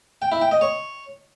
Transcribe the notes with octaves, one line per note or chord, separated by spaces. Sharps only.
G5
E4
G5
D#5
C#5